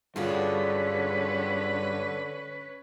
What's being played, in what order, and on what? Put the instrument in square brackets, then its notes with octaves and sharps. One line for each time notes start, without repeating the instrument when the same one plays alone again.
[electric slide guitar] G2 [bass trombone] D3 [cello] C#4 B4 [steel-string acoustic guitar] F4 F#4 G#4